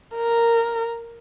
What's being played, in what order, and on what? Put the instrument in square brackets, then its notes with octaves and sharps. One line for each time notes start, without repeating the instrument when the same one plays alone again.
[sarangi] A#4